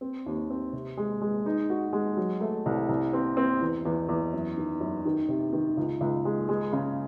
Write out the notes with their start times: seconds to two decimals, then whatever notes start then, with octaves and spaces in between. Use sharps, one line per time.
0.01 C4
0.26 D#2
0.50 C4
0.73 C3
0.97 G#3
1.21 G#3
1.46 D#4
1.70 F#4
1.93 G#3
2.17 F#3
2.41 A3
2.66 C2
2.89 C2
3.13 C4
3.37 C4
3.61 E2
3.85 E2
4.09 E2
4.33 F#2
4.57 D#3
4.80 F#2
5.05 D#3
5.28 C3
5.53 D#3
5.77 C#2
6.01 C#2
6.25 G#3
6.49 G#3
6.73 C#3